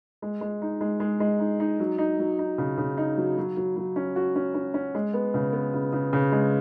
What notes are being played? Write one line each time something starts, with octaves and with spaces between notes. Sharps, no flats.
G#3
G#3
D#4
G#3
G#3
G#3
D#4
D#4
F#3
D#4
F#3
D#4
C#3
C#3
D#4
F#3
F#3
F#3
F#3
C#4
F#4
C#4
C#4
C#4
G#3
B3
C#3
B3
C#3
C#3
C#3
G#3